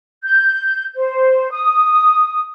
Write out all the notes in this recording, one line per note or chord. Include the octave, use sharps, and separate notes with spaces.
G6
C5
D#6